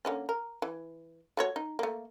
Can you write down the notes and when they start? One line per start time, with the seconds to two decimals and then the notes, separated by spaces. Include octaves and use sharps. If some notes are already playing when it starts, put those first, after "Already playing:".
0.05 D3 A#3 C#4
0.29 A#4
0.62 E3
1.37 A3 F#4 C#5
1.56 D#4
1.79 A3 A#3